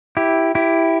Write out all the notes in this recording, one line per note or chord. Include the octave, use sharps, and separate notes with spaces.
E4 G4
E4 G4